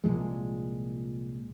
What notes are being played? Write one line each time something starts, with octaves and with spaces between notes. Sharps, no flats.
C2 A#2 F3 G#3